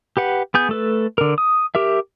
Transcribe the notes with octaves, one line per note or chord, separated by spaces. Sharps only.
G4 B4 F#5
B3 G#4 G6
A3 A4 B4
D3 A#4
D#6
G4 A#4 E5